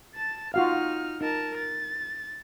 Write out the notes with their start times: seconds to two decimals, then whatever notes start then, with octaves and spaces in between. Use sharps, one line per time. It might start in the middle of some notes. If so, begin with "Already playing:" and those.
0.15 A5 A6
0.54 D#4 F4 F#4 F5 F6
1.21 D#4 A#4 A5
1.57 A6